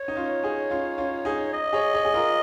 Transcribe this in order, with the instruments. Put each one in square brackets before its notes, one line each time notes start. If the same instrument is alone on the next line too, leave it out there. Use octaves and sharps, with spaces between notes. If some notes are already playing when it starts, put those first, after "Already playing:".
Already playing: [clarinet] C#5
[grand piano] D#4
C#4 F4
D#4 G#4
C#4 F4
C#4 F4
D#4 G#4
[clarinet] D#5
[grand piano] G#4 C#5
G#4 C#5
G#4
F4 A#4